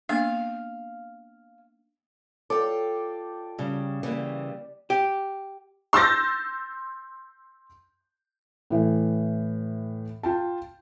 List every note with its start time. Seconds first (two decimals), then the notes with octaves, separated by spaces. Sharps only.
0.09 A#3 B3 D4 F5
2.50 F4 A4 D5 G5
3.58 C#3 G3
4.03 C#3 E3 G3 A#3
4.90 G4
5.93 C6 E6 G6 A6 A#6
8.70 A2 E3
10.23 F4 G5 A5